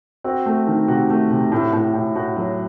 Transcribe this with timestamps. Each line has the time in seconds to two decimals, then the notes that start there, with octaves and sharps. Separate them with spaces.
0.24 C4 F#4
0.46 A3
0.67 D#3
0.88 C3 F#4
1.10 A3
1.31 C3
1.52 A2
1.73 A2
1.94 A2
2.15 A2 F#4
2.36 F#3